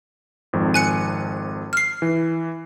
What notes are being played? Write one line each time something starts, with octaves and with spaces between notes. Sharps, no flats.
G#1 F2
G#5 F#6 C#7
F6 C7
E3